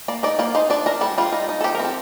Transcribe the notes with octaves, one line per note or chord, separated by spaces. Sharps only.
A#3 D5
D#4 D5
A#3 D5
D#4 C5
D4 D5
D4 A#4
G3 A4
G3 F4
D#4
D#4
A4
F3 G4
A#4
C4
A4